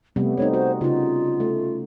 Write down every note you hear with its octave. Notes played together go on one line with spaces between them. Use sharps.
C3 G3 A3 B3
A3 C4 D#4 C#5
F#4 C5
C#3 D#4 F4
A3